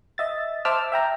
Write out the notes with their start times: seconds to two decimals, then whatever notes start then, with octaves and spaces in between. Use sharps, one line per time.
0.18 D#5 E5 A6
0.65 C5 E5 A5 D6 E6 F6
0.92 E5 G5 A#5